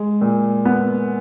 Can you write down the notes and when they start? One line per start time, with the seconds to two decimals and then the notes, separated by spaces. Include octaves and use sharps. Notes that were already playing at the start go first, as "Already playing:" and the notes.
Already playing: G#3
0.21 A#2
0.65 B3